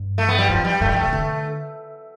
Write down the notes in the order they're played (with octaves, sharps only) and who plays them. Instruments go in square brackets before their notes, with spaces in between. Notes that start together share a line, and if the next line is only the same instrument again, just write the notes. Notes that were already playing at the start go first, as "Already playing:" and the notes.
Already playing: [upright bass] G2
[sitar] A3
B3
G3
[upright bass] F2 [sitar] F3
[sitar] G3
[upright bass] G2 [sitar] A3
[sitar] G3
[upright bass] A2 [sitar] A3
[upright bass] C3
D3